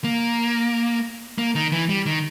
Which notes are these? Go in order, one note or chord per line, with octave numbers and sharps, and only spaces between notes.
A#3
A#3
D#3
E3
G3
D#3